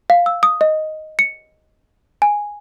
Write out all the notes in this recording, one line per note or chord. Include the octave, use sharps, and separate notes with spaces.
F5
E6
D#6
D#5
C#7
G#5